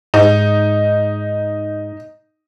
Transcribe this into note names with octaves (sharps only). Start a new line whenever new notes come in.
G#2 D#4